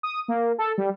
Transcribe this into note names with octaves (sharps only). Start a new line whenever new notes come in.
D#6
A#3
A4
G3